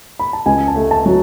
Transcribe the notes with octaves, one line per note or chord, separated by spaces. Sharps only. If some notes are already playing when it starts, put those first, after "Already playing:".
B5
A5
C#2 G#5
A5
A3
A5
F#3